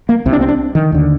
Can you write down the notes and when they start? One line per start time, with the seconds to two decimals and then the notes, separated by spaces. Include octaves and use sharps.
0.09 A#3
0.26 C2 C3
0.33 D4
0.41 C4
0.48 D4
0.75 D#3
0.92 D#2 D3